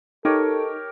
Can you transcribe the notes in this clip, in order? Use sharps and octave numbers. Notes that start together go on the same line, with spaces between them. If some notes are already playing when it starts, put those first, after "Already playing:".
D#4 G4 A4 A#4 C#5